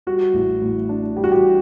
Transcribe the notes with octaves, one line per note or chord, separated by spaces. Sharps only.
G3 F#4
A1
A2
D4
G3 G4
F#4
G4